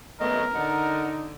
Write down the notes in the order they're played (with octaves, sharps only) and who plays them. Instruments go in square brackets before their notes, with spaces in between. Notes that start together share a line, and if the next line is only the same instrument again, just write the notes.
[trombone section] G#1 F#2 A3 [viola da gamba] B3 [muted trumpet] A#4 [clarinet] D#5
[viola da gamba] D3 [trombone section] D#4 [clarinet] F#5